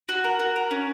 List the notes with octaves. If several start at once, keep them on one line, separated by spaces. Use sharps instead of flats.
F#4
A#4
F#4
A#4
C#4